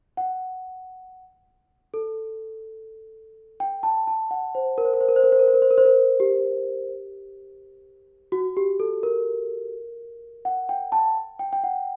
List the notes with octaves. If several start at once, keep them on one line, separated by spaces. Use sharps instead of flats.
F#5
A4
G5
A5
A5
F#5
C5
A#4
C5
A#4
C5
A#4
C5
A#4
C5
A#4
C5
A#4
C5
A#4
C5
A#4
G4
F#4
G4
A4
A#4
F#5
G5
A5
G5
G5
F#5